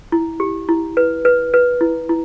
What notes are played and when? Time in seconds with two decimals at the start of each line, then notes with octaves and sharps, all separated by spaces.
0.12 E4
0.40 G4
0.69 E4
0.97 B4
1.25 B4
1.54 B4
1.81 E4
2.09 E4